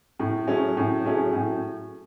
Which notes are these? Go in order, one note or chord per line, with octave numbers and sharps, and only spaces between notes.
A2
F#3 A3 C#4 G#4
A2
F#3 A3 C#4 G#4
A2